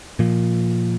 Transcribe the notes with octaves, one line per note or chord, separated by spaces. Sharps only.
A#2 F3